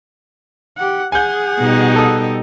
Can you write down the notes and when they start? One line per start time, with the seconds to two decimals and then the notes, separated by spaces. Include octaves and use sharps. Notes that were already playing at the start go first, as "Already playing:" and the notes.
0.78 G4 F#5
1.12 G#4 F#5 G#5 G6
1.60 B2 G3 D#4
1.96 A4 D#6